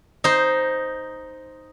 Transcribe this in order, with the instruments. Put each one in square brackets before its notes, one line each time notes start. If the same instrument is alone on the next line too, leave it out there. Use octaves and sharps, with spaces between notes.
[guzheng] D#4 C5